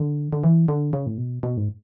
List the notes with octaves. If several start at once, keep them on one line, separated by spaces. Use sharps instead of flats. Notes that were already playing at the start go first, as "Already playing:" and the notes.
Already playing: D3
D3
E3
D3
C#3
A2
B2
B2
G#2